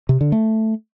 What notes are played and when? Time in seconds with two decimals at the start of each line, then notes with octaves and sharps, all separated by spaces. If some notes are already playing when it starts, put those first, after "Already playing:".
0.09 C3
0.21 D3
0.32 A3